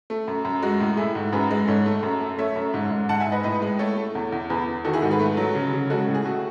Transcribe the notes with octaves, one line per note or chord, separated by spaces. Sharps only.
A3
F#2
F#2
G#3 F#4
A2
A3 E4 G#4
G#2
F#2 G#4 B4
G#3
G#2 A4 C#5
A3
F#2
A3
A3 C#5 E5
F#2
G#2
G#2
G#2 F#5 A5
E5 G#5
G#2
B4 D#5
A2 B4 D#5
G#3
A3 A4 C#5
A3
E2
E2
E2 G#4 B4
E2
D#3 F#4 A4
E4 G#4
G#2 F#4 A4
G#4 B4
A3
F#3
C#3
C#3
G#3 F#4 A4
A2
G#4
A3 F#4